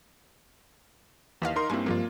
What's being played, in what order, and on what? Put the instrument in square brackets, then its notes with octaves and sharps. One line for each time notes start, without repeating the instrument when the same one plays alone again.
[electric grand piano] D#2 [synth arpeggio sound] E3 D#5 F5
[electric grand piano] D#4 A#4 C6
[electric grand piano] G2 A#3 C4 [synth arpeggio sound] E4 G#5
[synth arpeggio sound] G2 F3 G#3 [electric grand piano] A#3 F4